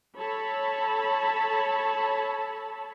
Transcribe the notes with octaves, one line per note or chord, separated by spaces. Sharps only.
A4 C#5 A5 B5